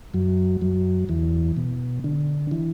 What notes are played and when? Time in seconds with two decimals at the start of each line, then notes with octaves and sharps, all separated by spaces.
0.14 F#2 F#3
0.61 F#2 F#3
1.09 E2 E3
1.57 B2
2.04 D3
2.51 E3